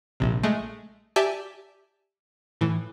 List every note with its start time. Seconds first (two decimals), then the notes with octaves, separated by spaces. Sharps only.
0.20 A#1 C3
0.43 G#3 A3
1.16 G4 D5 E5 G#5 A5
2.61 A2 E3